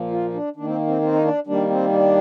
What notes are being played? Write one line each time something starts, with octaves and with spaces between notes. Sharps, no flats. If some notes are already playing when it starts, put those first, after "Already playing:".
Already playing: A#2 F3 A#3
F4
D4
D#3 A#3 D4
C4
C4
C4
D#4
D4
D#3 G3 A#3 D4
C4
D4